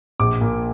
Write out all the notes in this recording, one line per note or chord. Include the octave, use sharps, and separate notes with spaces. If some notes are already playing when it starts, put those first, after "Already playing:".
A#1 D6
A#2